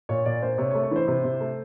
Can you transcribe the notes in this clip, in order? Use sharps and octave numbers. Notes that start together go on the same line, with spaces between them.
A#2 C#5
A#2 D5
A#3 C5
C3 C#5
C#5
A3
C#5
E3 C5
C3
C3
A3